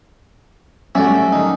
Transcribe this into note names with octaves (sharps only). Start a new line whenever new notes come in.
F#3 G3 A3 C#4 F#4 D5 E5
D#3 D#4